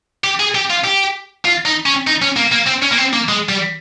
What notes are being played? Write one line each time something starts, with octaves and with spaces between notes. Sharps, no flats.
G4
G#4
G4
F4
G4
F4
D#4
C#4
D#4
C#4
A#3
A#3
C4
C#4
A#3
C4
A#3
G#3
G3